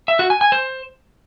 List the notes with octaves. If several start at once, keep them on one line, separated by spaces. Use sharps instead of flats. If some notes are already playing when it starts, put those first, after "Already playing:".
E5
F#4
G#5
G#5
C5